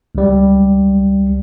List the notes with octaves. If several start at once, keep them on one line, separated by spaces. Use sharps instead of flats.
C#2 G3